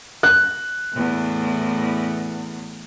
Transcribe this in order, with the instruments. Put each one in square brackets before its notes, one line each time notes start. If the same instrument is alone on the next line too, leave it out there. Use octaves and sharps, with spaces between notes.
[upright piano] F#6
[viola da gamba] E2 A2